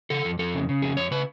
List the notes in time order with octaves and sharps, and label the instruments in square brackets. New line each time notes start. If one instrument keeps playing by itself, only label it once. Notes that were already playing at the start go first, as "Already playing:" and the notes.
[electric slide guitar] C#3 A4
F2
F2 A4
C#3
C#3
F2 G#4
F2 C#5
C#3 B4